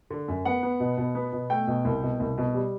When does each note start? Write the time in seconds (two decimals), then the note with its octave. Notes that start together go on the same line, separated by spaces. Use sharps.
0.10 D3
0.28 F#2
0.45 B3 F#5
0.63 B3
0.80 B2
0.97 B2
1.15 B3
1.33 B2
1.50 A3 G5
1.67 B2
1.85 C2
2.03 B2
2.20 C2
2.38 B2
2.54 G3